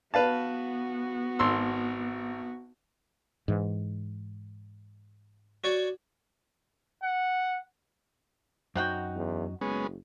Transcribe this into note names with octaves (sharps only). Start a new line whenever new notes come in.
B3 F#4 B4 F5 A5
G#1 C6 E6
G#2 E3
F#4 C#5 D5
F#5
F#2 C4 D#4 F#4 F#5 G5
E2
F#1 G#3 B3 C#4